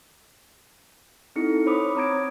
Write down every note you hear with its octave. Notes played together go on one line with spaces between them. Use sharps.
C4 D#4 E4 A4 C#7
C5 C#5 B5 D6 D#6
C4 C#5 A#5 D#6 G#6 D7